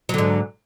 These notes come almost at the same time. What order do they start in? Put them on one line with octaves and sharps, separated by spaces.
F#3 D3 G#2